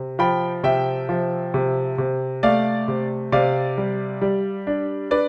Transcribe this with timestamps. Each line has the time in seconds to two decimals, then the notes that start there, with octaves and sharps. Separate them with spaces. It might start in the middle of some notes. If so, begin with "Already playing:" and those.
Already playing: C3
0.19 F3 G5 B5
0.63 C3 E5 G5
1.09 F3
1.54 C3
1.98 C3
2.43 A3 D5 F5
2.88 C3
3.32 C3 D5 F5
3.78 G3
4.21 G3
4.67 D4
5.11 D4 B4 D5